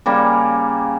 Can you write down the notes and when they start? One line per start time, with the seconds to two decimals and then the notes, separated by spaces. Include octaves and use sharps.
0.06 C#3 G3 A#3